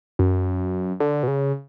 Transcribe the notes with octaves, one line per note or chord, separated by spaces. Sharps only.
F#2
D3
B2
C#3